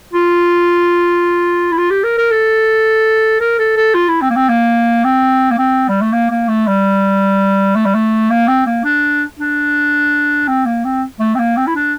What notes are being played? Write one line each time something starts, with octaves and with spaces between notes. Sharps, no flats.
F4
E4
F4
G4
A#4
A#4
A4
A#4
A4
A4
F4
E4
C4
A#3
C4
A#3
C4
A#3
C4
G3
A3
A#3
A#3
A3
G3
A3
G3
A3
A#3
C4
A#3
D4
D4
C4
A#3
C4
A3
C4
A#3
C4
E4
D4